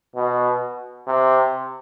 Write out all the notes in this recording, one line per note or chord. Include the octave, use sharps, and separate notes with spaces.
B2
C3